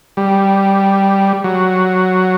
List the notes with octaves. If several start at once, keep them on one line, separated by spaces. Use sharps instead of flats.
G3
F#3